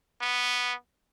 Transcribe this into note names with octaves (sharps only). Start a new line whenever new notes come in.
B3